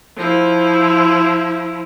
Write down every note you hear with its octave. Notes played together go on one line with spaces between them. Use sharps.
F3 E4